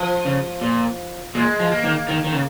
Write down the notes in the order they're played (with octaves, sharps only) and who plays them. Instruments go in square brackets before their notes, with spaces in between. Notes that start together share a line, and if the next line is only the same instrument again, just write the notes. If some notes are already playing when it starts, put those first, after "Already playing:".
Already playing: [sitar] F3
[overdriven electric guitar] C#3
A#2
[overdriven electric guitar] A#2 [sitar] G#3
[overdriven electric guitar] F3
[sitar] A#3
[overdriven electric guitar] D#3
D#3
D#3
C#3